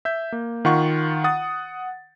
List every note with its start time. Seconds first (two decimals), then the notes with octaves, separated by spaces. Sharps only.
0.05 E5 G6
0.32 A#3
0.65 D#3 F4 F#5 C#6
1.24 F#5 D#6 A6